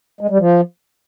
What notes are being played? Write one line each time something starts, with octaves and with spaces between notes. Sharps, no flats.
G#3
G3
F3